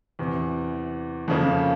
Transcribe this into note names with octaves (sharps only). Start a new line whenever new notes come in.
E2 C3 E3
F2 C#3 F3 A#3 C#4